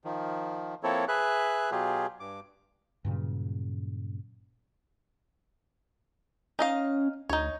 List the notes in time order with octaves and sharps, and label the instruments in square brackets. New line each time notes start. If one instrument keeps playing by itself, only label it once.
[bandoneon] D#3 F3
F3 A#3 C4 E4 A4 C#5
G#4 B4 E5 F#6
B2 F#3 F4 G4 G#4
G2 D6
[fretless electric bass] G2 A#2 C#3 F#3
[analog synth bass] C#4 [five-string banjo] D#4 D#5 F5
[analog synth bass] D2 [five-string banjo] D#4 C#5